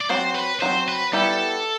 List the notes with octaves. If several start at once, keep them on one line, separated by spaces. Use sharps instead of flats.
D5
F#3 C4 F#4 C5
B4
F#3 C4 F#4 C5
B4
G3 B3 E4 G4 A4